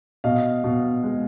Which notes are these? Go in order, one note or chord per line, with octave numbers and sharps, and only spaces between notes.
B2 D#5 F5
B2
G#3